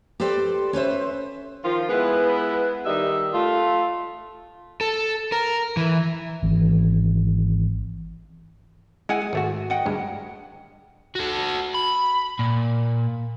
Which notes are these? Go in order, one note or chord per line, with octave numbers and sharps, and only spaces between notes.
G4 A4 B4 C5 D5 G5
C#4 B4 C5 E5
D#3 F3 F4
G#3 B3 E4 B4
D#3 G3 D#4 E5
A3 F4
A4
A#4
E3
G#1 E3
G#3 E4 F#5 G#5
G#4
G#1 A3 F#4
D#5 F#5 G5
D2 G2 G#3
F#4 A4
B5
A#2